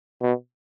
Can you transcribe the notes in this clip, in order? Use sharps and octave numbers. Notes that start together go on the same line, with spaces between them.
B2